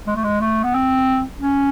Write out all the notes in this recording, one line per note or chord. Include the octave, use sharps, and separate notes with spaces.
G#3
A3
G#3
A3
B3
C4
C#4